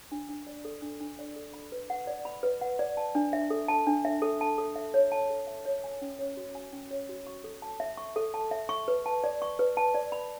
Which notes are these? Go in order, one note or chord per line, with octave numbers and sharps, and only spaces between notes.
D4
D4
D5
A4
D4
D4
D5
A4
B5
B4
F#5
D5
B5
B4
F#5
D5
A5
D4
E5
A4
A5
D4
E5
A4
A5
A4
E5
C#5
A5
A4
E5
C#5
G#5
C#4
C#5
F#4
G#5
C#4
C#5
F#4
C#6
A4
A5
E5
C#6
A4
A5
E5
C#6
B4
A5
D5
C#6
B4
A5
D5
B5